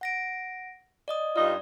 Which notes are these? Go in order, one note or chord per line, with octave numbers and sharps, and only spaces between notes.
F#5 A#6 D7
D5 D#5 D#6
G2 D#4 F4 D5